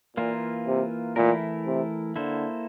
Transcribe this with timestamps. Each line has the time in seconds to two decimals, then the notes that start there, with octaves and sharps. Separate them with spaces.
0.17 A#2 E3 A#3 F4 A#4
0.67 C3
1.16 A#2 E3 A3 E4 A#4
1.66 C3
2.16 D3 A#3 E4 A4 C5